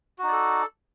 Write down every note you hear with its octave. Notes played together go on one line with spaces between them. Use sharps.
D#4 F#4 A4 D5